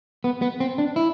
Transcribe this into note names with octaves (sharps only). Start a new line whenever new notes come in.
B3
B3
C4
D4
E4